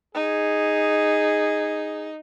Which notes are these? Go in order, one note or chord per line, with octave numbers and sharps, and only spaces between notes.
D#4 G#4